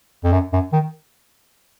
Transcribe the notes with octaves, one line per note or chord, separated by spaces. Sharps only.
F2
F#2
F#2
D#3